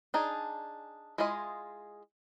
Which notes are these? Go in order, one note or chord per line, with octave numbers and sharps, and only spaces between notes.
D4 D#4 G#4 D5 G#5
G#3 E4 F4 G#4 D#5